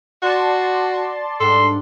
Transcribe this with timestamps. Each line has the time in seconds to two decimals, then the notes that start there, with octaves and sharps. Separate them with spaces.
0.22 F#4 D5 A5 C6
1.40 G#2 G3 D4 A4 C6